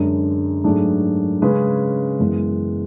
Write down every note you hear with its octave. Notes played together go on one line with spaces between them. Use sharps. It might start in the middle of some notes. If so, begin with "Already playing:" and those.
Already playing: F#2 D3 G#3 D4
G#2 F#3 A3 D4 G#4
C#3 G#3 C#4 G#4 B4
F#2 E3 G#3 B3